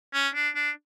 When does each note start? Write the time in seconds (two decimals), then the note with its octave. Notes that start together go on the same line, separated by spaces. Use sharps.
0.14 C#4
0.34 D4
0.55 D4